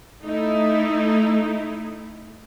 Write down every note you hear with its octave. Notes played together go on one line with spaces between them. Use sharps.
A3 D#4 E4